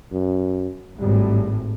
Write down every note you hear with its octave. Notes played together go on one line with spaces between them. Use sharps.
F#2
G#1 A2 G3